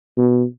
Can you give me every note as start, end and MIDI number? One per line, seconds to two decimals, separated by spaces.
0.17 0.43 47